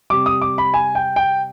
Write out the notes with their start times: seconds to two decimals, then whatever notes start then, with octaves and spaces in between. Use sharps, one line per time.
0.10 C3 G3 D6
0.26 D#6
0.42 D6
0.58 B5
0.74 G#5
0.95 G5
1.16 G5